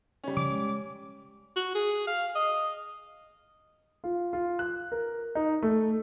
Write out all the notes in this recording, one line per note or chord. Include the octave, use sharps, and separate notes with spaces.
G3 C#4
C#3 F3 D6
G#3
F#4
G#4
F5
D#5
F4
F4
F#6
A#4
D#4
A3